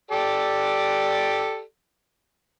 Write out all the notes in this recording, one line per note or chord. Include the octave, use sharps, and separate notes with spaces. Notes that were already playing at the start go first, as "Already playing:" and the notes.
G4 A4 D5